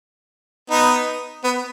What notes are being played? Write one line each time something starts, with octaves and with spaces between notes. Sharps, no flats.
B3 D#4
B3